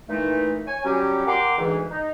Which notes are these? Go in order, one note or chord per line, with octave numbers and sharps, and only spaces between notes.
A#2 E3 A3 D#4
C#5 G#5
F#3 G3 C#4 G4
A#4 F#5 G5 A#5 C6 D6
D2 G#2 E3
D#4